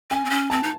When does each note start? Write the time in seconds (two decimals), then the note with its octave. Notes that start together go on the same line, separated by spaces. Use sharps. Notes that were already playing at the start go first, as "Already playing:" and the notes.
0.10 C#4 G#5
0.25 C4
0.30 C#4
0.50 C4 A5
0.63 D#4